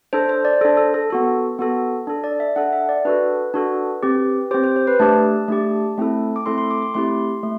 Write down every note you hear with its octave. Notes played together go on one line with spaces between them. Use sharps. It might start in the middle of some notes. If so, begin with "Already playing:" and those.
D4 A4 C5
C5
D5
D4 A4 C5
A4
A4
B3 F#4 A4
B3 F#4 A4
D4 A4
D5
E5
D4 A4 F#5
E5
D5
D4 F#4 A4 B4
D4 F#4 A4
C4 G4
C4 G4 C5
C5
C5
B4
A3 D4 G4 A5
A3 D4 G4
A3 C4 E4 A4
D6
A3 C4 E4 A4 C6
C6
D6
D6
A3 C4 E4 G4 C6
A3